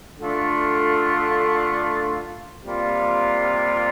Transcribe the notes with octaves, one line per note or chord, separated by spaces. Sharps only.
D3 A3 D4 F4
C3 G3 A#3 F4